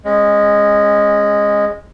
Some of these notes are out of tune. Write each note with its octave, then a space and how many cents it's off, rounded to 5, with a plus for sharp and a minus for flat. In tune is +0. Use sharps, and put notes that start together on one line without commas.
G#3 -10 C#4 -25